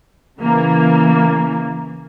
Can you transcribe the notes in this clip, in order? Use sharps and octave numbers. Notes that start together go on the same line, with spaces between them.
C#3 E3 A#3